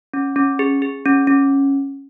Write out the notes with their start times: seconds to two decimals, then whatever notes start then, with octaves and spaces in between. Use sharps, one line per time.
0.14 C#4
0.36 C#4
0.59 G#4
0.82 G#4
1.05 C#4
1.27 C#4